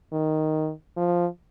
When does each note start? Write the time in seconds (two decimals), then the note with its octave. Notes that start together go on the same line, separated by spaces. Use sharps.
0.13 D#3
0.97 F3